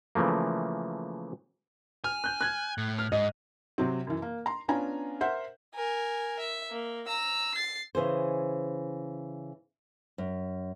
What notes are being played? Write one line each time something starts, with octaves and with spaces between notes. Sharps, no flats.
C#3 E3 F3 A3 A#3
G#5 F6
F#6 G6
F#6 G#6
A2
F6
G#2 D#5
C3 F#3 C4
F#2 E3
A#3
A#5 C6
B3 C#4 D4 F4 G#5 A#5
A#4 C5 E5 F#5
A#4 G#5
E5
A#3
A#5 E6
A6 C7
C#3 E3 G#4 C5
F#2